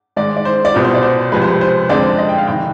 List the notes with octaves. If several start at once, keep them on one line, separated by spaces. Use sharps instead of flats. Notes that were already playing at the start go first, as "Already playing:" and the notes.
G#2 D#3 G#3 D5
D5
C5
D5
C2 B2 B3 F4 C5
C5
D5
C5
C2 C3 F3 G#3 B4
C5
B4
C5
F2 D3 G#3 C4 D5
D#5
G5
F5
F1 D#3 G5